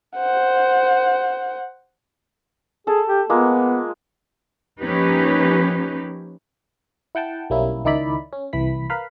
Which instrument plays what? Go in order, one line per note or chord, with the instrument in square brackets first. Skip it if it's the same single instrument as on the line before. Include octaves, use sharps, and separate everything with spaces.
[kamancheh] C5 F#5
[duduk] G#4 [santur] A4 A5
[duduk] G4
[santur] G#3 A#3 F4 [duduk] B3
[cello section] F3 A#3 C#4 D#4 G4 B4
[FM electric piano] E4 F#5 G5 A5
B1 G3 A#3 C#4 E4
C#2 D#3 D#4 E4 D5 B5
C#4
C2 E3 B5 B6
A#4 B4 F5 B5